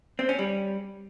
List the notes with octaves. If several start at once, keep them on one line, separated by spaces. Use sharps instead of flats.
C4
C#4
G3